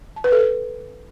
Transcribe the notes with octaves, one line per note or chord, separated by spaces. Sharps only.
A5
B4
A4